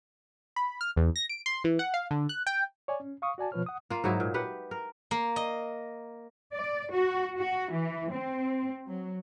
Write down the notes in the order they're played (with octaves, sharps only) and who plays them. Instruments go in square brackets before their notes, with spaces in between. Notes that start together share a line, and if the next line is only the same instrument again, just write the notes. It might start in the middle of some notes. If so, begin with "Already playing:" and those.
[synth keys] B5
F6
E2
A#6
D7
C6
E3
F#5
F5
D3
F#6
G5
[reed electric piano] C#5 D5 G#5
C#4
F5 C#6 D#6
F#4 D5 G#5 A5
B2 F3 F4 B4 C#5 F6
F#5 D#6
[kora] A#3 F4
G#2 F#3 D#4 E4
A#2
G4 B4 F#5
A#4
[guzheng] A#3
D#5
[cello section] D5
F#4
F#4
E3
C4
F#3